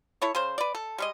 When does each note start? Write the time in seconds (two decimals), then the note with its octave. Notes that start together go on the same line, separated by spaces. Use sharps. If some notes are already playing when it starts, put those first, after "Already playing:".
0.22 E4 A4 C#5
0.35 C#3 C5
0.58 B4 D5
0.75 A4
0.98 G3 G#3 D#5